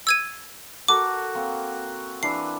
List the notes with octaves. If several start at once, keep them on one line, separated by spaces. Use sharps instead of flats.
E6 G#6 D#7
F#4 A4 A#4 D6
A#3 C4
E3 D4 C7